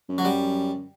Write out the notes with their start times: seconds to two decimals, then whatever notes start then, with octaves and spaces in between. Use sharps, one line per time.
0.09 F#2
0.18 F#3
0.25 G3